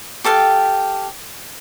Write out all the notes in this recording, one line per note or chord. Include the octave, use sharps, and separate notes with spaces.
G4 A4 F5 G5